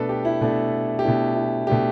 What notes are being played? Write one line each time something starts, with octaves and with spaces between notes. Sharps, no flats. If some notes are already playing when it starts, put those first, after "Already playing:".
Already playing: B2 A3 D4 A4 B4
G4
E4
B2 A3 D4
G4
B2 A3 D4 E4
E4
B2 A3 D4 G4